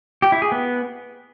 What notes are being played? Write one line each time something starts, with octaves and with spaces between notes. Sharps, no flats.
G4
E4
G#4
B3